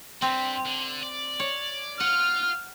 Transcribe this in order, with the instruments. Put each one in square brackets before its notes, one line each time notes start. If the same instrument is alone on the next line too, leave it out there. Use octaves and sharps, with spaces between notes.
[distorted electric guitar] G2 G3 [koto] C4
[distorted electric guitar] D3
D5
[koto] C#5
[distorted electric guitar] F4 [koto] F#5 [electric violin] F6